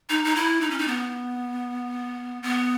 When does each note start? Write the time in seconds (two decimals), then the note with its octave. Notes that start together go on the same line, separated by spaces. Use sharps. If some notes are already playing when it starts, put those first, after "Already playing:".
0.09 D#4
0.24 D#4
0.36 E4
0.61 D#4
0.70 C#4
0.78 D#4
0.87 B3
2.43 B3